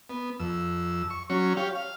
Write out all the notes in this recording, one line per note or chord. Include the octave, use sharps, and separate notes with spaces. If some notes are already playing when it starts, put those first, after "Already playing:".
B3
F2 E6
C#6
F#3 C#4 C#6
G4 C#5 F5
F5